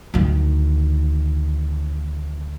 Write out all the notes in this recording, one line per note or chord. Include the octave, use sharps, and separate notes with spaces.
D2 D#3